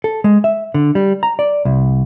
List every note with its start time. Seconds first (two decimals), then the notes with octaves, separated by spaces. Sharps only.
0.04 A4
0.24 G#3
0.44 E5
0.74 D3
0.95 G3
1.23 A#5
1.39 D5
1.65 C2